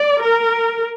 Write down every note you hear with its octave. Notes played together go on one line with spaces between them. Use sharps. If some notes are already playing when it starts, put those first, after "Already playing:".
Already playing: D5
A#4